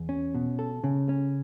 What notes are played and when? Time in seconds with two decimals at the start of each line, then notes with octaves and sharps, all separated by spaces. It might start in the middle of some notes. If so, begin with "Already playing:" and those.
Already playing: E2
0.09 C#4
0.35 B2
0.59 A4
0.84 C#3
1.09 C#4